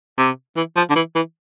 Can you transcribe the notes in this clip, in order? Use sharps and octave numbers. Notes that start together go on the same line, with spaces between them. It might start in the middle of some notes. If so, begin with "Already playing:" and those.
C3
E3
F3
D3
E3
E3